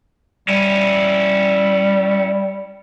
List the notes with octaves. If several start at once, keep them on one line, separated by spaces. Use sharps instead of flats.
G3 C#4 E4